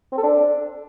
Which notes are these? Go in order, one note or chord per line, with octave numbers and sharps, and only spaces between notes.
C4
A4
D4